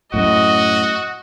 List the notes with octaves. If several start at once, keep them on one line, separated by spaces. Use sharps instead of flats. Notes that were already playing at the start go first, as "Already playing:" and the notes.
F#2 A2 F#4 D#5